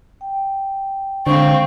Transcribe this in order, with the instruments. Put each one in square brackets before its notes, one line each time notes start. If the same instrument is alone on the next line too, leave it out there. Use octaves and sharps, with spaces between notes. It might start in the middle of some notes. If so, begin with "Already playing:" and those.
[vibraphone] G5
[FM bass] D3 [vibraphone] G#3 F5 [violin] C4 [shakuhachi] C#6